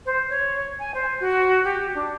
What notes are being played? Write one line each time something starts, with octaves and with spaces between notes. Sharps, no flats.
C5
C#5
G#5
C5
F#4
G4
D4